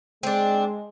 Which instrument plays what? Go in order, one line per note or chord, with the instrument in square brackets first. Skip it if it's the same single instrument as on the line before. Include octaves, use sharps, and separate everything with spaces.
[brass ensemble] G#3 [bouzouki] C4 D4